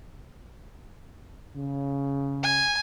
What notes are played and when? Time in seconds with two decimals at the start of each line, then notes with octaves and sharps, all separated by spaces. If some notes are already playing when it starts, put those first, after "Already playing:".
1.55 C#3
2.43 G#5